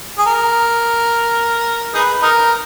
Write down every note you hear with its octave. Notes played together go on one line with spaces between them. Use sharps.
G#4
A#4
D#4 G#4 B4
D#4 A#4